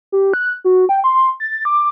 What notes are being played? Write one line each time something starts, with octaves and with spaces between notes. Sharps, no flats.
G4
F#6
F#4
G5
C6
A6
D6